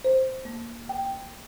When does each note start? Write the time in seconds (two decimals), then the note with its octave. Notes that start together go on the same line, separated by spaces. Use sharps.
0.05 C5
0.45 A#3
0.89 G5